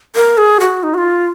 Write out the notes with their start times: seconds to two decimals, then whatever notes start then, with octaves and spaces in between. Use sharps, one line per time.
0.16 A#4
0.38 G#4
0.60 F#4
0.83 D#4
0.94 F#4
0.98 F4